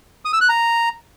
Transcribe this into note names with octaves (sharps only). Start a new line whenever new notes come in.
D#6
E6
F#6
A#5